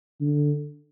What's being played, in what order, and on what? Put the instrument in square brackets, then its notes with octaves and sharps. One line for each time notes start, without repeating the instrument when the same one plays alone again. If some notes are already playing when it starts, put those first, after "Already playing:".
[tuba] D3